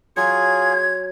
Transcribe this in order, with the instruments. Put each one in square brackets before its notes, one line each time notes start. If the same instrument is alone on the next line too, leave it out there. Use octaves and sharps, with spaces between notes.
[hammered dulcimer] F#3 [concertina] F4 G#4 [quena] G#6